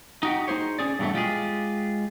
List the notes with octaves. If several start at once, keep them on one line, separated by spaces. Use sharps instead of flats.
D#4 F#4 G4
D#4 F4 G#4 C5 C#5
C#4 G#4 D5
G2 B2 E3 F#3 A3
G#3 F4 G4 G#4